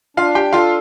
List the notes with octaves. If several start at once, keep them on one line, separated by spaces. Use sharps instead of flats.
D4 F4 F5
G4 G5
F4 A4 F5